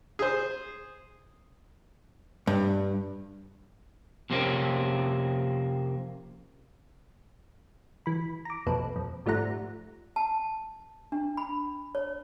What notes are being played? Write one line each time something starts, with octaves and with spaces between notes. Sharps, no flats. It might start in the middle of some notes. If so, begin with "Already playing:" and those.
G#4 C5
G2
F2 C3 A#3 C4 C#4
E3 B5
A#5 D6
B1 F2 A#2 A4 B4
F2
G#1 F3 G3 A3 F#5 A#5
A5
D4
B5
C#5